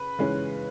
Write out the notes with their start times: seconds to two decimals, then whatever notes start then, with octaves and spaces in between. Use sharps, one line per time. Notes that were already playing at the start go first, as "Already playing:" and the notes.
Already playing: C#3 B4
0.19 C#3 E3 G#3 C#4